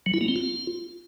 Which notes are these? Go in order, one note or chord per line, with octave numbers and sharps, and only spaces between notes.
F#3
E4
A#3
C4
F4